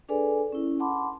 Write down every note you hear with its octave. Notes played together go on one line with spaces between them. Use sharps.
D4 G#4 A4 B4 D5 G#5
C#4 E4
F#5 A5 B5 C6 D6